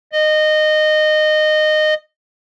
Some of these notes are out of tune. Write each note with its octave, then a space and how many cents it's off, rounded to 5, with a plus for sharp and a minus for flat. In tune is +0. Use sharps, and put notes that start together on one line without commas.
D#5 -20